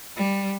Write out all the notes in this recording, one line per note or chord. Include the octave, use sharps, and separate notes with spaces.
G3